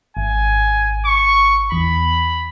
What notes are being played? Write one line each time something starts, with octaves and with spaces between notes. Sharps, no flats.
G#1 G#5
C#6
E2 B5